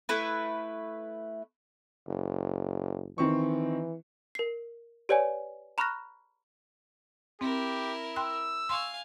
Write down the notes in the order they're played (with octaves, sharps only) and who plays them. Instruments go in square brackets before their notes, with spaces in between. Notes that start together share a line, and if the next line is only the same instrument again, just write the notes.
[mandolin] A3 E4 B4
[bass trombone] F#1
[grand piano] D#3 C4 C#6 [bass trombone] E3
[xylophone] A#4 C7
G4 B4 C#5 D5 F#5 G#5
A#5 B5 C#6 F6 F#6 A#6
[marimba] C4 [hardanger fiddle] E4 A#4 [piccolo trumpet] G4
[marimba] G5 C6 F#6 [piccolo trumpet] E6
[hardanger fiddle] F5 G#5 [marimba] C6 C#6